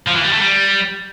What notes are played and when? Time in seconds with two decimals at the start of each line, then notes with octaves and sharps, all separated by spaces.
0.08 F3
0.16 E3
0.25 G3
0.33 A3
0.42 G3